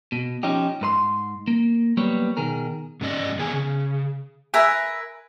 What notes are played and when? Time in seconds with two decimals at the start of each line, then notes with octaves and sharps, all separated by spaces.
0.12 B2
0.43 F3 C#4 D#4 G4
0.81 G#2 B4 C6
1.48 A#3
1.97 F#3 G3 A#3 B3 B4 C#5
2.37 B2 D#3 G#4 A#4
3.01 G#2 C3 C#4 D5 D#5
3.39 D#3 B3 G#4 G#5
3.51 C#3
4.54 A#4 B4 E5 G#5